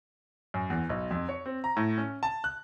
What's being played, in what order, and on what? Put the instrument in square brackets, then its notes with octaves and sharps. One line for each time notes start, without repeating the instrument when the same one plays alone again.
[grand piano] F#2
E2
B1
F2
C#5
C4
A#5
A2
C#4
A5
F#6